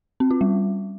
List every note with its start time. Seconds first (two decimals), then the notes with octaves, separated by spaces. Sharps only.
0.20 C4
0.31 F4
0.41 G3